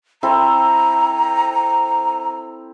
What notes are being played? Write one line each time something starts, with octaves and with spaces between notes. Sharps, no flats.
C4 E4 A4 A#5